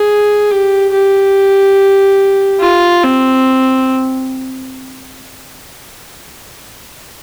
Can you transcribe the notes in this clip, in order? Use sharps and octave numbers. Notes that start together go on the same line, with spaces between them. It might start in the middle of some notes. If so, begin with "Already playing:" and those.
Already playing: G#4
G4
G4
F4
C4